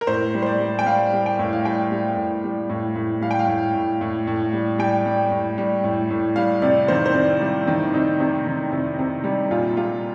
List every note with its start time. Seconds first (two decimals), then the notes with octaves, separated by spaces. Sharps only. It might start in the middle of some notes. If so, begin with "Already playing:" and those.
0.01 A#4
0.07 A2 C5
0.34 G3
0.42 C5
0.46 D5
0.60 G3
0.79 G5
0.86 G3 F5
1.13 G3
1.26 G5
1.39 A2
1.53 F5
1.65 G3 G5
1.91 G3
2.17 A2
2.44 G3
2.70 A2
2.96 A2
3.21 G3 F5
3.31 G5
3.39 F5
3.48 A2
3.74 A2
4.01 A2
4.27 A2
4.53 G3
4.78 G3 G5
5.06 G3
5.31 A2
5.58 G3
5.84 A2
6.10 A2
6.36 G3 F5
6.62 C3 D5
6.88 D#3 C5
7.06 C5
7.14 C3 D5
7.41 G3
7.67 D#3
7.94 C3 D#4
8.20 C3
8.46 D#3
8.72 C3
8.99 C3
9.24 G3
9.51 A#2 F4
9.76 G3 F4